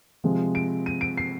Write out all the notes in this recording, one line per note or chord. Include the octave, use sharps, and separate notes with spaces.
C3 F3 G#3
D7
D#7
D7
C7